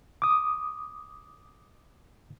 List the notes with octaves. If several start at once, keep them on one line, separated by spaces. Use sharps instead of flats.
D6 D#6